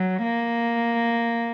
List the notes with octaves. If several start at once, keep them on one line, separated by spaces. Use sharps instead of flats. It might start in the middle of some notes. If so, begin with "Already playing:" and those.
Already playing: F#3
A#3